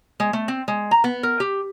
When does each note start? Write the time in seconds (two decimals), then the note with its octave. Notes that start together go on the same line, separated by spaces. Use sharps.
0.20 G#3
0.33 A3
0.48 C4
0.68 G#3
0.91 A#5
1.04 B3
1.23 A#4
1.40 G4